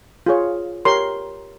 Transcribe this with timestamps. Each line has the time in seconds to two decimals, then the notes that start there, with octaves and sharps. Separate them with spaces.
0.26 F4 G#4 C#5
0.85 G4 A#4 C#5 C6